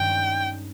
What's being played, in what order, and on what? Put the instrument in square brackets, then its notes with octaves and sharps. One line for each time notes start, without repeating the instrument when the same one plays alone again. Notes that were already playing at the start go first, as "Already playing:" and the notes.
Already playing: [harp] G2 D#3 G#3 C#4 [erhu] G5